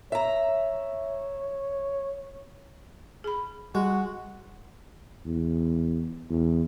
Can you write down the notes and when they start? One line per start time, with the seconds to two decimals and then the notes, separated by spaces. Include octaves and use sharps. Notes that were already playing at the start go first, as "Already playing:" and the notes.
0.12 C#5 E5 A#5
3.24 G#4 B5
3.75 G3 G#3 F#4
5.26 E2
6.30 E2